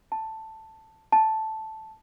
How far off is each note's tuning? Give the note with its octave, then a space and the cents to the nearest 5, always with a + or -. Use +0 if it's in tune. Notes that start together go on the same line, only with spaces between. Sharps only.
A5 +5
A5 -5